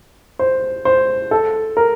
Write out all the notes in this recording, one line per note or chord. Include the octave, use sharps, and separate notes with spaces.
C5
C5
A4
A#4